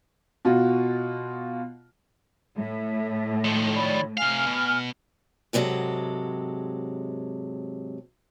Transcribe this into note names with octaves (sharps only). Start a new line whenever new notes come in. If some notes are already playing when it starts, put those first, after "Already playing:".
B2 F4 F#4
A2 E5
D#3 F3
C#5 D5 B5
C3 F5 G#5 F6
B2
G#2 C3 F#3 G#3 A4